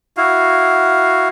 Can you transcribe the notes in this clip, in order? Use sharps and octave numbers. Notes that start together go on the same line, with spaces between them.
E4 F#4 F5